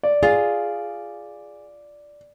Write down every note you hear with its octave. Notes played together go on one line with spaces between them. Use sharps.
D5
F4 G#4